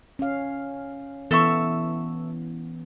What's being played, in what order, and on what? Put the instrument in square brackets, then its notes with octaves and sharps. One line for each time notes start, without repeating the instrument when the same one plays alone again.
[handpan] C#4 F5
[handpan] E3 B3 [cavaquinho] A4 E5 C#6